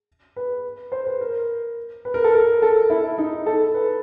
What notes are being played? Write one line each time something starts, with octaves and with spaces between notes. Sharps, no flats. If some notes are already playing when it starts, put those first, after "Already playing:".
B4
C5
B4
A#4
B4
A#4
A4
A#4
A4
E4
E4
D#4
A4
B4